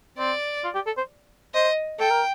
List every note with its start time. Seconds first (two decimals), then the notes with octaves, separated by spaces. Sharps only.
0.18 C4 D5
0.64 F4
0.75 G4
0.87 A4
0.98 C5
1.54 C5 D#5
2.00 A4 G5
2.11 A#4